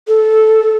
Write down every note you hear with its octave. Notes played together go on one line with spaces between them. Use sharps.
A4